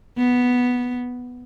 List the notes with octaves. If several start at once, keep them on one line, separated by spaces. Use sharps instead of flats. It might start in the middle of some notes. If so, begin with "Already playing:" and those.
B3